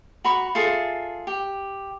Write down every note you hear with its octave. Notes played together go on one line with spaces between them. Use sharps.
F#4 A#5 B5 C#6
F4 G#4 A4 E5
G4